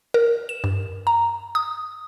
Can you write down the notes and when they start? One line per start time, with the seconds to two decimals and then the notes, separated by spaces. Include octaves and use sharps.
0.14 A#4
0.49 E7
0.64 G2
1.07 A#5
1.55 D#6